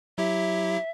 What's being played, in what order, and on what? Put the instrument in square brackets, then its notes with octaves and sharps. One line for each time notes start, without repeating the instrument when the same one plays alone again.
[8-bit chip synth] F#3 E4 G4 [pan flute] E5